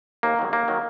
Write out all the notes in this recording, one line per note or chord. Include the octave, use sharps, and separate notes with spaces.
D#2 A#3
D#3 F#3
D#2 A#3
D#3 F#3